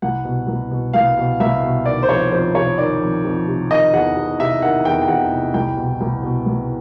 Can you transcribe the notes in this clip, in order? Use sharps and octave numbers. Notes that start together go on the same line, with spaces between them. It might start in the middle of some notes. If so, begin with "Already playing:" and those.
C2 F#5
B2
C2
B2
C2 F5
B2
C2 E5
B2
D#3 D5
C5
F2 C#5
F2 C5
C3 C#5
D#3 D5
F2
F2
C3
D#3 D#5
E2 F#5
E2
C3 E5
D#3 F#5
E2 G5
G5
E2 F#5
C3
C2 G5
B2
C2
B2
C2